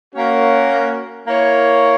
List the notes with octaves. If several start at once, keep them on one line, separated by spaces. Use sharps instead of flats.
A#3 C#4 F#4
A#3 E4 A#4 C#5